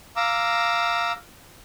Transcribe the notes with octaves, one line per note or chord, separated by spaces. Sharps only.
F5 A#5 D6 E6